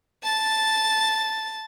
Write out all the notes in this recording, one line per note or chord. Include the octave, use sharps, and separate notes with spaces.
A5 A6